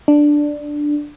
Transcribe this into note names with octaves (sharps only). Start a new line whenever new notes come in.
D4